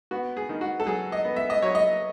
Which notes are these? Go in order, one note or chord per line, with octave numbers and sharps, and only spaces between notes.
B3 F#4
G#4
D#3
F#4
A4
F#3 G#4
D#5
B3
E5
D#5
F#3 C#5
D#5